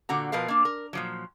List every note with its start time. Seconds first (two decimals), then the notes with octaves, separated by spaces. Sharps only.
0.09 A#2 D3 F#4 A#5
0.32 B2 F3 A#4 B4 F5
0.48 A#3 D4
0.65 A#4
0.93 A#2 F3 F#3